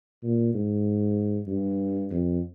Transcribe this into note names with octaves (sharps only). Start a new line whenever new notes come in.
A#2
G#2
G2
F2